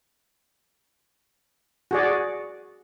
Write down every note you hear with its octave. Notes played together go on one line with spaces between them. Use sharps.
F#4 G#4 D5